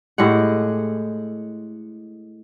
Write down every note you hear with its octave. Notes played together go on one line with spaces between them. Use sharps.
A2 G#3 G4 F#5